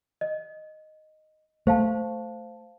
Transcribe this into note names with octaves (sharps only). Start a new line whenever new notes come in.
D#5
A3 C5 F5 A5